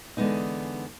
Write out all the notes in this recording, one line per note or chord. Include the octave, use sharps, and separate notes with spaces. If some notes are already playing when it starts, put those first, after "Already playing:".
D3 E3 G#3 B3 C4 D#4